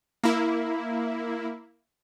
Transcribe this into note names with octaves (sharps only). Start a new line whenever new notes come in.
A#3 E4